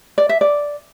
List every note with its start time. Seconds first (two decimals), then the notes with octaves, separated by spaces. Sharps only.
0.18 D5
0.29 E5
0.41 D5